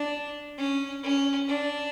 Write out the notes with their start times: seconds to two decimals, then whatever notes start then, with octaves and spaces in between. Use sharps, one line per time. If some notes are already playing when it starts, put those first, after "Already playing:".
Already playing: D4
0.58 C#4
1.03 C#4
1.48 D4